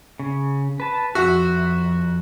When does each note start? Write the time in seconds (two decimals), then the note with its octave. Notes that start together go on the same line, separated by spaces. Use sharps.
0.20 C#3
0.80 B4 A5
1.15 F2 F#4 E5